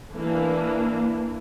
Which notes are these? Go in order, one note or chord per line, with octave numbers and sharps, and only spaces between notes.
E3 A#3 D4